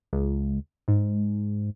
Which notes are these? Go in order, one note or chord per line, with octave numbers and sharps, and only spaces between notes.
C#2
G#2